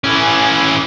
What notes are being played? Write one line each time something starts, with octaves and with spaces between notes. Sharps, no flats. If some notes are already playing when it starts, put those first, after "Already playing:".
E3 C#4